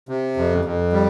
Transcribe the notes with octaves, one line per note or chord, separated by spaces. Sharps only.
C3
F2
F2
G3